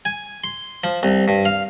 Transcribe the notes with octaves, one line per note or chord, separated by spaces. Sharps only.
G#5
C6
F3
C2
G2
F5